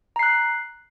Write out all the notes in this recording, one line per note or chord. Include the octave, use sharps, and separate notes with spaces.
A#5 F#6 C7